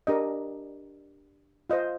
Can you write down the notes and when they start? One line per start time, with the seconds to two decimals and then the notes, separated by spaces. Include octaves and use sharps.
0.07 D4 G4 A#4 D#5
1.70 F4 C5 D#5